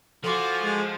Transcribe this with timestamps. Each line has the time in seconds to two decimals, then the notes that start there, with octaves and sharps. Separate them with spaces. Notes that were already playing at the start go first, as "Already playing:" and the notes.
0.24 F3 F#4 A4 F5 G#5 C6 D6
0.62 G#3